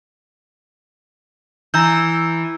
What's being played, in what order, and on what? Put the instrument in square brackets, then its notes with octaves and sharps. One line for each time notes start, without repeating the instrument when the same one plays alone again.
[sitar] E3 [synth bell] A#5 E6 G6